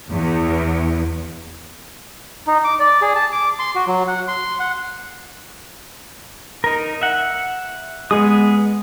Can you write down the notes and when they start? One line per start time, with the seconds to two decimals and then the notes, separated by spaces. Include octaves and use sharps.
0.10 E2
2.47 D#4
2.64 D6
2.80 D5
3.02 G#4
3.15 A5
3.32 D6
3.59 C6
3.75 F#4
3.87 F#3
4.07 F#5
4.28 C6
4.59 F#5
6.64 D#4 A#4
7.01 E5 F#5
8.11 G#3 B3 G#4 D#6